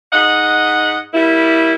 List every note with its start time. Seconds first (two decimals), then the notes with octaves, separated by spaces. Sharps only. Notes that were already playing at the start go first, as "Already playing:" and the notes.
0.13 G#2 D#5 F#5
1.14 G3 A#3 E4